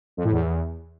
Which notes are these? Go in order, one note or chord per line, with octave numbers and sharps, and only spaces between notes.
F2
A2
E2